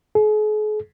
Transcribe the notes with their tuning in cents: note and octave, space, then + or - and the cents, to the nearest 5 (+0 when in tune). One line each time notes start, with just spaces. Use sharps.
G#4 +45